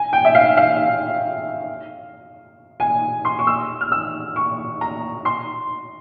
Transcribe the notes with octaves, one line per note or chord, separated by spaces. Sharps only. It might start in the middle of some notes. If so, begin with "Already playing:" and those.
Already playing: G#5
G5
E5
F5
F5
G#5
C6
C#6
E6
F6
E6
C#6
A#5
C6